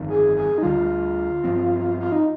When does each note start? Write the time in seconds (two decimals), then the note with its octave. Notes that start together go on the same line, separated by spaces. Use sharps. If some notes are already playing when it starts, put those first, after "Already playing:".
Already playing: G1 F2 D#3
0.09 G#4
0.36 G#4
0.58 D#4
0.62 D2 D3 G3 F4
1.44 G2 F3 C4
2.00 F4
2.12 D#4